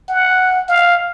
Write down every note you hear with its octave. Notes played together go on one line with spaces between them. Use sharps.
F#5
F5